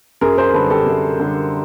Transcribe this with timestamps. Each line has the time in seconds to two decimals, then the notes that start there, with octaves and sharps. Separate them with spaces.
0.21 F#2 G#4 A#4
0.38 A#4 C5
0.54 D3 G3 A4 B4
0.70 G4 A4
0.86 F#2
1.20 D3 G3